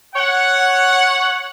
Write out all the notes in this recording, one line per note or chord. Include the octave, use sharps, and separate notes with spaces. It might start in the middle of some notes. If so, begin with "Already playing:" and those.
C#5 F#5